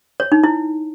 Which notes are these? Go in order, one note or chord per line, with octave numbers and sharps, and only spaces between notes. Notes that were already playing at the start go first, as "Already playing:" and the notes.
C#5
D#4
E4